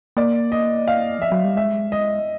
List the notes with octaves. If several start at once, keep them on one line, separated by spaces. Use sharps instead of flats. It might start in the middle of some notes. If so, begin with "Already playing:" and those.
A#3 D5
D#5
F5
F3 E5
F#3
G3
G#3 E5
D#5